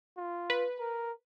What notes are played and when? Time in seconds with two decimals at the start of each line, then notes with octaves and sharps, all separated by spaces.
0.17 F4
0.50 B4
0.79 A#4